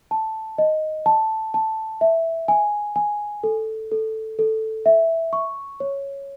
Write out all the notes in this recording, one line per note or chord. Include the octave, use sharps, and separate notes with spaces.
A5
D#5
A5
A5
E5
G#5
G#5
A4
A4
A4
E5
C#6
C#5